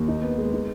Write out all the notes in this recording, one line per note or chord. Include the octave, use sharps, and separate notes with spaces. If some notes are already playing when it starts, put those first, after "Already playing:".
Already playing: D#2
D#4
B3
G#3
D#4